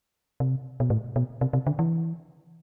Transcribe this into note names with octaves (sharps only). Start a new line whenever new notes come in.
C3
B2
A2
B2
C3
C3
D3
E3